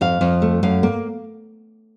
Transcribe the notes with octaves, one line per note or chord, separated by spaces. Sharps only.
F2 F5
F2
A3
F#2 F5
A#3